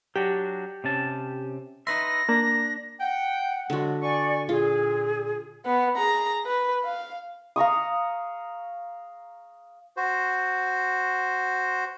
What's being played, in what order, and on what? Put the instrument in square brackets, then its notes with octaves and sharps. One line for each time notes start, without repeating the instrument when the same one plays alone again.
[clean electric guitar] F#3 D4 F#4 [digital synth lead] G4
[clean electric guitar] C3 C#4 A5
[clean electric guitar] D#4 B4 E5 [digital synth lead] C6 [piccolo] A#6
[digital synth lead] A#3 [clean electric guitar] D4
[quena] F#5 [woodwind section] G5
[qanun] D3 F#4 [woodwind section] F#3 G#3 F4
[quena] D5 [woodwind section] G#5 C#6
[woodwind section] A#2 [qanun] F4 [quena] G#4
[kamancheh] B3
G#4 A#5
B4
F5
[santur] F5 A#5 C#6 D#6
[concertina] F#4 C5